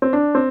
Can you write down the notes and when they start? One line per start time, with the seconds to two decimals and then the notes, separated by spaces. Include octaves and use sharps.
0.02 C4
0.13 D4
0.35 C4